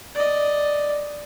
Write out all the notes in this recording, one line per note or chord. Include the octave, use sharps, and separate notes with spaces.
D5 D#5